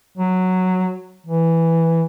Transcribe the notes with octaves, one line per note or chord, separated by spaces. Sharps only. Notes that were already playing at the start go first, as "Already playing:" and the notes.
F#3
E3